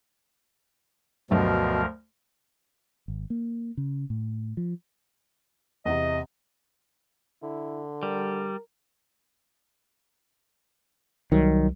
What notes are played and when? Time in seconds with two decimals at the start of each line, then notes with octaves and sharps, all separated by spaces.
1.31 D2 G2 B2 F3 F#3 A3 A#4
3.08 G#1
3.30 A#3
3.77 C#3
4.10 A2
4.57 F3
5.85 E2 C3 D#5
7.43 D3 E4
8.03 G3 A#4
11.32 C2 D#3 F#3 G3